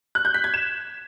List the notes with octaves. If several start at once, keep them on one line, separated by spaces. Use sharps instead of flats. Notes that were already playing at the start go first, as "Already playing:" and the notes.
F#6
G6
B6
G#6
E7